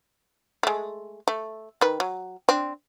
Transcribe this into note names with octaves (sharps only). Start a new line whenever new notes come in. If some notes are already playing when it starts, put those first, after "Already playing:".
G#3 A3
A3
D#3 B4
F#3
C4 D4